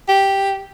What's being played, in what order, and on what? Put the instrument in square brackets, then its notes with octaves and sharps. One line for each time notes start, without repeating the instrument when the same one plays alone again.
[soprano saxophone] G4